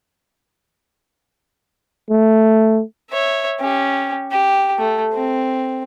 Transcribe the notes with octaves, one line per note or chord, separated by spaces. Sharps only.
A3
C#5 E5
C#4 G4
G4
A3
C4